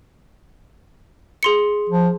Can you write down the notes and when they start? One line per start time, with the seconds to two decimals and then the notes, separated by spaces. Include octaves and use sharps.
1.43 G#4 C6 C#7
1.89 F3